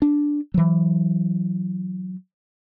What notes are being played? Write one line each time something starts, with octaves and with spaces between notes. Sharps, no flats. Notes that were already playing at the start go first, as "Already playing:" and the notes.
D4
E3 F#3